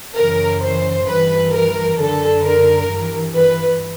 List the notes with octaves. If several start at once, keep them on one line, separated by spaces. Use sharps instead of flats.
F#2 C#3 E3 A#4
C5
G2 E3 B4
A#4
F#2 D3 A4
A#4
G2 E3
B4